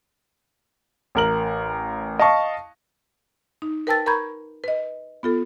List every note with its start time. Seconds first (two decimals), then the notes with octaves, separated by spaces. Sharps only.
1.15 A1 A#4 F#7
2.19 D#5 F5 A5 C#6
3.62 D#4
3.87 A#4 B4 G5 A5 E6 A6
4.06 A#4 A#5 B5 C#6 G6 G#6
4.64 B4 D#5
5.23 B3 F4 A4